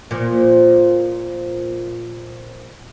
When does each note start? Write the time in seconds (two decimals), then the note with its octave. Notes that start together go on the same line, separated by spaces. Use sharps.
0.11 A#2 F3